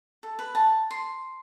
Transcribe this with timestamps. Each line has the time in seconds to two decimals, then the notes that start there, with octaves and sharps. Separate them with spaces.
0.23 A4
0.39 B4
0.55 A5
0.91 C6